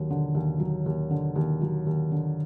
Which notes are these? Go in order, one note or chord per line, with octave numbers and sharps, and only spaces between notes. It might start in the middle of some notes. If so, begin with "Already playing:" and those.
Already playing: D#2 F#3
D3
D#2
F#3
D#2
D3
D#2
F#3
D#2
D3